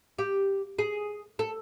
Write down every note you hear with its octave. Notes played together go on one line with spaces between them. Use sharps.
G4
G#4
A4